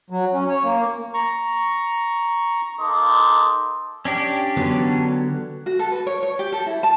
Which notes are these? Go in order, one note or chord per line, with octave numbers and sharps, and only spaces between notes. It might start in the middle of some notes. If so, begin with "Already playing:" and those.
F#3
C#4
C#5
A#3
A#5 C#6
A#3 D#4 A4 C6 D6 D#6
C#4 D4 G4
D3 F#3 B3
F#4
A4
B4
C#5
C#5
G4
A4
E4
A5